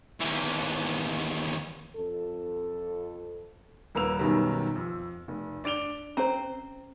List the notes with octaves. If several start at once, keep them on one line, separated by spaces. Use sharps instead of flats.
D#2 E3
F2 A4
D#1 A#3 B4 E6 F7
B1 F#2 B2 D#3 F#3 G3
F2
F1
D4 D5 D7 F7 G7
C4 C#4 C5 A#5